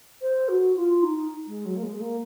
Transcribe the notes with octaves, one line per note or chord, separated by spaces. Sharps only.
C5
F#4
F4
D#4
G#3
F#3
A#3
G#3
G#3
A#3